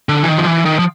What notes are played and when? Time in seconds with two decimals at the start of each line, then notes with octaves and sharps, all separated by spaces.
0.09 D3
0.23 E3
0.28 D#3
0.38 F3
0.46 E3
0.65 D#3
0.79 F3